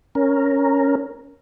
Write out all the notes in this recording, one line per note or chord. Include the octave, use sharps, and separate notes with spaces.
C#4 A#4